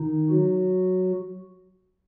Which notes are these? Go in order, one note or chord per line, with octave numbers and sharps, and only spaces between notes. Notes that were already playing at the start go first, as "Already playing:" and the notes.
Already playing: D#3 D#4
F#3 F#4